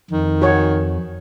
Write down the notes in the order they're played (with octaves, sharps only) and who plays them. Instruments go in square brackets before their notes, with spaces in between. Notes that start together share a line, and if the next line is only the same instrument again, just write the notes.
[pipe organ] F2 [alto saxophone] D#3
[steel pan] F#4 C#5